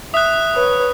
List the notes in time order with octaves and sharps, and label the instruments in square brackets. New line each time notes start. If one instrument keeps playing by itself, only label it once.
[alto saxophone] E5 [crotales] D#6 F#6
[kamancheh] B4 C#5